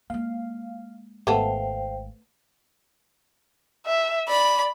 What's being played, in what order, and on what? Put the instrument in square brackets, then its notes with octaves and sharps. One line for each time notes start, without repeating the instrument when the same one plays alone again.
[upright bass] G#3 A#3 [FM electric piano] F5
[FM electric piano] G#1 G#2 [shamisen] A3 B3 A4 [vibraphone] C5 F5 G5
[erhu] E5
[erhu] D5 [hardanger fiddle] B5